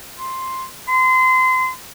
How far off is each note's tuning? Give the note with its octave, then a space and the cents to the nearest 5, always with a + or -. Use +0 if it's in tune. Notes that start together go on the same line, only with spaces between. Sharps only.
C6 +5
C6 -30